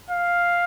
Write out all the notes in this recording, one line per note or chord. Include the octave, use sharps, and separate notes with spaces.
F5